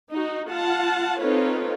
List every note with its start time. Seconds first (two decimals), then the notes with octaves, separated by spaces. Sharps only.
0.12 D#4 F#4
0.50 F4 F#5 A5
1.19 C4 D#4 F4 A4 B4 C#5